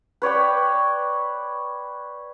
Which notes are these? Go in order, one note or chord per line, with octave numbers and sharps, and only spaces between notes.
B4 C#5 D5 G5